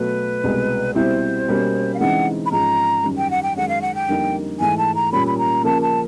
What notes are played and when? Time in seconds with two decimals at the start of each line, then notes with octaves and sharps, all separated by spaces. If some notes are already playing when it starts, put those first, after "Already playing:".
Already playing: B2 F#3 A3 B4
0.44 C2 B2 G#3
0.95 B2 G3 C4 E4 C5
1.48 B2 G3 A#3 C#4
1.94 F5
1.99 C#3 E3 G#3 C4 D#4 F#5
2.46 B5
2.52 G#2 F3 G#3 C#4 A#5
3.04 F#2 D#3 G3
3.18 G5
3.31 F#5
3.43 G5
3.56 F#2 D#3 G#3 C#4 F#5
3.69 F5
3.82 F#5
3.95 G5
4.08 F2 D3 G3 A#3 D#4
4.60 G#2 E3 A3 G#5
4.78 A5
4.95 A#5
5.12 A#2 G3 A#3 C#4 B5
5.27 B5
5.38 A#5
5.64 C#3 F3 A#3 A5
5.82 A5